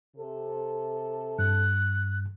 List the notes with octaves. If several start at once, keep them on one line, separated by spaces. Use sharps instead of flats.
C3 A4
G2 F#6